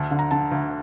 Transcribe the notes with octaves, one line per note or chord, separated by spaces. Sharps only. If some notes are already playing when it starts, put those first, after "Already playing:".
Already playing: D2 A5
D3
A#5
D3 A5
D2